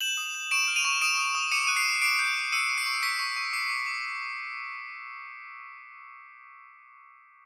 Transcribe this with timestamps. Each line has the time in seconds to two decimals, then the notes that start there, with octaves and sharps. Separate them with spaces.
0.01 G6 E7 F#7
0.17 D#6
0.34 G6
0.51 C#6 D7 E7
0.68 F6
0.76 D#7 F7
0.85 C#6
1.01 D#6 D7 E7
1.18 D#6
1.35 D#6
1.51 D6 C#7 D#7
1.67 F#6 D#7
1.76 C7 D7
1.85 D6
2.02 D6 C7 D7
2.19 G6
2.36 D6
2.52 E6 C#7 D#7
2.69 C#6
2.78 C7 D7
2.86 C#6
3.02 C#6 B6 C#7
3.19 C#6
3.36 C#6
3.53 D6 C7
3.70 D6
3.86 D6